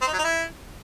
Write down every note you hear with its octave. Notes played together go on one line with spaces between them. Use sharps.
C4
D#4
F#3
D#4
E4